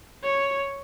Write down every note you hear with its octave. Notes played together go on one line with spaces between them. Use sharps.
C#5